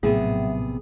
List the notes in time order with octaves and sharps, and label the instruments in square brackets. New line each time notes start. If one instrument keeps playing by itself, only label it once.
[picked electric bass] A#1 C3 B3 [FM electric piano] A2 [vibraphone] F#3 E5 G5 [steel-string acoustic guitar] G#4